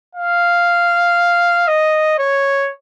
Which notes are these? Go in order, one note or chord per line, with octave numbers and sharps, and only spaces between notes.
F5
D#5
C#5